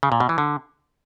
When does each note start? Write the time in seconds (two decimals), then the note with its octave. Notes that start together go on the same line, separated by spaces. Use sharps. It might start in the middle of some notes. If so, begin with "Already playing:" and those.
0.03 C#3
0.12 A#2
0.20 B2
0.29 E3
0.38 D3